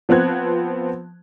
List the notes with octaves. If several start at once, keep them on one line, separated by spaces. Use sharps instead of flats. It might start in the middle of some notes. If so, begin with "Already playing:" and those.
F3 B3 C4 F#6 G#6